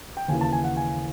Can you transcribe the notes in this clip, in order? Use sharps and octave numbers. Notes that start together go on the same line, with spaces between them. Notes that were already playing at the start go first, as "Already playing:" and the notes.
G5
D#2 C#3 E3 G#5
A5
G#5
F#5
G#5